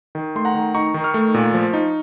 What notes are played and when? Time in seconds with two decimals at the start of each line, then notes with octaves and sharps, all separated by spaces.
0.15 D#3
0.35 A3 C6
0.45 F#5 A#5
0.55 D#3
0.74 D#4 A#5 C#6
0.94 D#3
1.04 C#6 F6
1.14 A3
1.34 A#2
1.54 F3
1.73 D#4